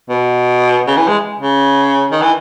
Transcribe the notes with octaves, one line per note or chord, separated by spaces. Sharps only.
B2
C#3
E3
G#3
C#3
D#3
E3